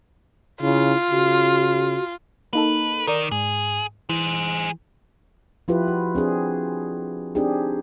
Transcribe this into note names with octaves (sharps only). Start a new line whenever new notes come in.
C#3 E4 F4
C#3 F#4
A#3 D#4 A4 B4
D#3 A#4 D5
G#2 G#4
E3 G#4 C5
F3 E4 F4 G4 B4
F#4
C4 D4 G#4
C4 D4 D#4 G4 G#4